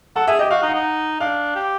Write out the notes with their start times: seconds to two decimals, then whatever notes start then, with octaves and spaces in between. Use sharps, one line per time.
0.16 A4 F#5
0.27 G#4 E5
0.39 G4 D#5
0.50 F#4 F5
0.62 D#4
0.68 F#5
0.74 D#4
1.20 D4 F5
1.55 G4